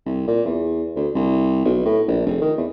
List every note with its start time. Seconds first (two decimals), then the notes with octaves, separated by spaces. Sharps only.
0.06 C2
0.28 A#2
0.46 E2
0.96 D2
1.15 C2
1.65 B1
1.85 A2
2.07 A#1
2.26 F1
2.41 D#3
2.58 E2